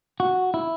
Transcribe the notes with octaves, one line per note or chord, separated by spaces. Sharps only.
F#4
E4